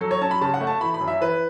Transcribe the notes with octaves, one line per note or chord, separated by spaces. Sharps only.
F#3 A4
C#5
C#4 A5
B5
C#3 A5
F#5
A3
A5
E3 B5
B5
F#2
E5
E3 B4